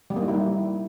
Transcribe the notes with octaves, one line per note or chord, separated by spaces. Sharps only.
G3
A#3
D#4
E4
G3